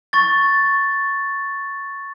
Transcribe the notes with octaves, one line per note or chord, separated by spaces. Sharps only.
C#6 A6